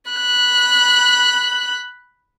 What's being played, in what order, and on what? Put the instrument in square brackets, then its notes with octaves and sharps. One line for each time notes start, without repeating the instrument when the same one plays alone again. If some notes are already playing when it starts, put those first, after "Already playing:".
[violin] B5 F#6